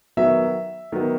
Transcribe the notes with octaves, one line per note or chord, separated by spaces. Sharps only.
D#3 F#3 B3 E5
D#3 F#3 B3